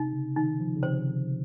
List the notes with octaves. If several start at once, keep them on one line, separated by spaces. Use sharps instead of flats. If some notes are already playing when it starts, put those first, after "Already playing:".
Already playing: C3 D#4
C#3
D#3 D#4
F3
C#3
C3 C5